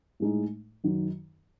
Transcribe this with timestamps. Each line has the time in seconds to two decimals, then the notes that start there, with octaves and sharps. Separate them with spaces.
0.20 A2 G#3 D#4
0.84 F#2 D#3 F#3